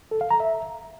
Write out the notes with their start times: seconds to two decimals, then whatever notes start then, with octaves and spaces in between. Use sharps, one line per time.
0.11 A4
0.21 F5
0.31 A#5
0.40 E5